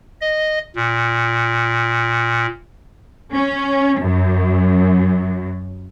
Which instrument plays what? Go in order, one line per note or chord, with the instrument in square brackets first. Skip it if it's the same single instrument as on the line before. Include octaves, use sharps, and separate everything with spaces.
[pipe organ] D#5
A#2
[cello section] C#4
F#2